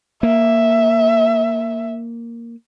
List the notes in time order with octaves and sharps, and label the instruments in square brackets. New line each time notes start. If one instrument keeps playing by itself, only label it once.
[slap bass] A#3 [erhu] E5